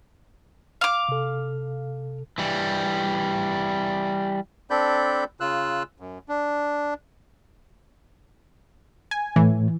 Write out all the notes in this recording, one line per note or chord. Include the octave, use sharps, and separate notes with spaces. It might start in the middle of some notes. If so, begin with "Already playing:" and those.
F5 D6
C3 A4
E3 G3
C4 D4 A4 D5 B5 G6
C#3 F4 E6 F#6
F#2
D4
G#5
A2 E3